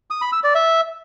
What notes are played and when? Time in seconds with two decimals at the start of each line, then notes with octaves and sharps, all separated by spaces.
0.10 D#6
0.22 B5
0.33 E6
0.44 D5
0.55 E5